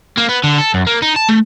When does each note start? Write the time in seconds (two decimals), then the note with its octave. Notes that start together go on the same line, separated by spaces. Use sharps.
0.18 A#3
0.29 B3
0.44 D3
0.58 A4
0.74 F#2
0.87 A#3
1.02 D#4
1.16 A5
1.29 A3